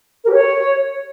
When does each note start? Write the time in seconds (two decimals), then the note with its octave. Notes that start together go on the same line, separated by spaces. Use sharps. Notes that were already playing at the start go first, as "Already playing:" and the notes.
0.24 A#4
0.29 G4
0.34 C#5